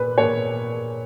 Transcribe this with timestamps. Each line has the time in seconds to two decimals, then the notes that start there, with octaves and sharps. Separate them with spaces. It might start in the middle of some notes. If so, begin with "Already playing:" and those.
Already playing: A#2 B4
0.18 A#2 A#3 C#5